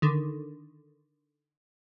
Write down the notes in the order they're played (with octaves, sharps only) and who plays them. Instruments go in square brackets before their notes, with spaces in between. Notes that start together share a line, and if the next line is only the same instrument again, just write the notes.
[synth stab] D3 D#3